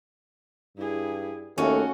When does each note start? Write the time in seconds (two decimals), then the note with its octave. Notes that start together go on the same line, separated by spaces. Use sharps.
0.77 G2 E4 G#4
1.58 D#2 A3 C#4 F#4